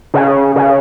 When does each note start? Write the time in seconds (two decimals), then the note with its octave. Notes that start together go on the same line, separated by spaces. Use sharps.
0.14 C#3
0.56 C#3